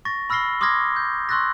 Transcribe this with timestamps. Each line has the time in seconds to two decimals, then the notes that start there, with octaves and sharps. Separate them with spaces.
0.05 C#6 A6 A#6
0.30 B5 E6 F6 A#6 C7 G7
0.61 C6 D6 D#6 F6 G#6 A#6
0.96 G6
1.29 C6 C#6 E6 F#6 A6 A#6